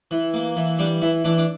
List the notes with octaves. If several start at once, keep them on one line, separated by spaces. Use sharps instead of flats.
E3
A#3
E3
G3 D4
E3 E4
E3 D4
D4